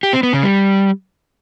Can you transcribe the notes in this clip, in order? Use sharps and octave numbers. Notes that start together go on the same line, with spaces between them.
G4
C4
B3
C#3
G3